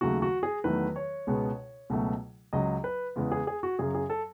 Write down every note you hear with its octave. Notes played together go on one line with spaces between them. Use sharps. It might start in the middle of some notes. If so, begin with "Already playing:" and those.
D#2 C#3 F#3 A3 F#4
F#4
G#4
E2 D#3 F#3 A3 B4
C#5
C#2 B2 G#3 B3
C#2 B2 F#3 A3
C#2 C#3 F#3 D#5
B4
E2 C#3 G#3 B3
G#4
G#4
F#4
F#2 C#3 F#3 G#4
G#4
A4